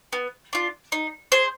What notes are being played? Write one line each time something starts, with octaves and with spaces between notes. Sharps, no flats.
B3
D4 F4
D#4
G#4 C5